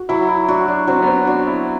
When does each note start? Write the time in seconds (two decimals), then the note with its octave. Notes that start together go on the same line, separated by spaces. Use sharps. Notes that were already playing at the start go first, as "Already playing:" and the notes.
Already playing: F#4
0.09 F#3 E4
0.29 E4
0.48 D4 F#4
0.68 D4
0.87 F#3 C4
1.02 B3
1.07 C4
1.27 D4 F#4
1.47 E4